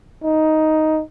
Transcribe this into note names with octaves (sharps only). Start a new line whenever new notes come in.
D#4